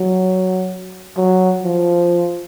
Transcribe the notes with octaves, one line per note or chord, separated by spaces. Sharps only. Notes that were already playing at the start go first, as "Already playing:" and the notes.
Already playing: F#3
F#3
F3